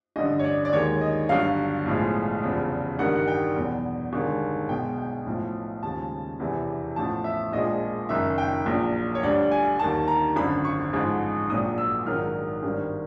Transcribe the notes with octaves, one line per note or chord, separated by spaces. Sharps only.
A1 G2 D3 D#5
C#5
D5
D5
D#2 D#3 G#3 C#5
D#5
G1 G2 D3 F#3 F5
B1 A2 F3 G#3
F1 E2 C#3 F3
A1 G2 D#3 G3 F#5
F#5
G5
E2 B2 F#3
G1 G2 D#3 G#3
B1 B2 G#3 G5
G5
B1 A2 F3
D#2 C#3 F3 G#3 A5
E1 E2 C3 E3
A1 A2 F3 A5
E5
A#1 A#2 F3 G#3 D#5
F#1 F#2 D#3 E5
G5
A#1 A#2 F#3
C#5
D2 D3 G3 D5
G#5
D#2 D#3 G3 A5
A#5
G#1 F#2 D3 B5
C#6
A1 G#2 F3 G#3
A#1 A#2 F#3 D#6
E6
A#1 G#2 D#3 F#3 F6
G#1 G2 D#3 G3